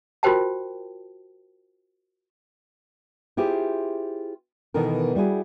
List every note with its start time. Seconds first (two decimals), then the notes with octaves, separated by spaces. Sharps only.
0.23 F4 F#4 A#4 C5 G5 A5
3.37 E4 F4 G4 G#4 C5
4.74 B2 D#3 E3 B3 A4 A#4
5.15 G3 E4 F#4 G#4